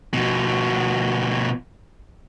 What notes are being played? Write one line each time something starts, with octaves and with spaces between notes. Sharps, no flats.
B2 F3